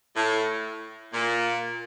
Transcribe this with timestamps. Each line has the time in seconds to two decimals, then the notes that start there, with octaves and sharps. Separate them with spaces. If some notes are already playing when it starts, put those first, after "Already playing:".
0.15 A2
1.12 A#2